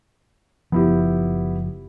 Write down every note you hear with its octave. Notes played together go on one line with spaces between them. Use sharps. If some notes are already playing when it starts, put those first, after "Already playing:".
F#1 F3 B3 E4 G4